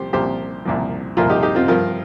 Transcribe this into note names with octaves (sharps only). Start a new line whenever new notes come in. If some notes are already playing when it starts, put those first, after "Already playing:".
Already playing: C2 A#2 F3 G4 C5
C2 A#2 F3 G4 C5
C2 A#2 F3
C2 A#2 F3 F4 A#4
D#4 G4
D#4 G4
C4 F4
G2 F3 F4 A#4